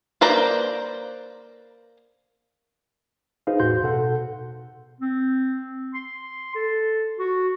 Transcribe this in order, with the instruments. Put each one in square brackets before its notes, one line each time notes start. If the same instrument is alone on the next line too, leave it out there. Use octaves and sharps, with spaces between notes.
[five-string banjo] A#3 B4 C5 D5 A#5
[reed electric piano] D#4 G#4 B4 C5 F5
E2 A2 F#4 C6 G6
B2 A4 F#5
[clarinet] C4
C6
A4
F#4